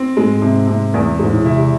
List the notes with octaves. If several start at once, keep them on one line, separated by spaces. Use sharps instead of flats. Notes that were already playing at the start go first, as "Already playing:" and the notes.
Already playing: C4
G#2 G#3
C3
C3
E2
G#2 G#3
A2
C3 E4
C3